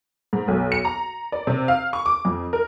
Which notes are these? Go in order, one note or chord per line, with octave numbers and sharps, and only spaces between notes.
G#2
B1
C#7
A#5
D5
C3
F5
C#6
D6
F2
A#4